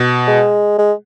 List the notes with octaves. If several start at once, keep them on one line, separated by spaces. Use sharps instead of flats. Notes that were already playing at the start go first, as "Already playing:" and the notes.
Already playing: B2
G#3
G#3